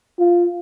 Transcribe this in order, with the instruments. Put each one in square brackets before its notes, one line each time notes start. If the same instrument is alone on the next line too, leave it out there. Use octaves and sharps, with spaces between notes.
[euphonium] F4